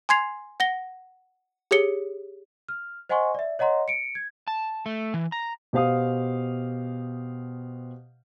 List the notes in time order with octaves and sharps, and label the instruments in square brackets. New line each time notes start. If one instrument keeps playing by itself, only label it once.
[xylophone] G#5 C6 G#6 C7 F7
F#5 A#6 G7
G4 G#4 C#5 C#7 G7
[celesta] F6
C5 D#5 F#5 G#5 C6 C#6
D5 E5
C#5 D#5 F#5 A#5 C6
C#7 D7
G#6
[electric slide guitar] A5
A3
E3
A#5
[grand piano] B2 G4 C5 F5 D#6